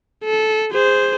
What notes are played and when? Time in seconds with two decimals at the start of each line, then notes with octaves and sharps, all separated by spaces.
0.24 A4
0.72 G#4 C5